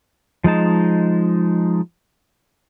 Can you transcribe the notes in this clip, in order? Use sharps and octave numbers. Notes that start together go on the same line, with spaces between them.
F3 G#3 D#4 A5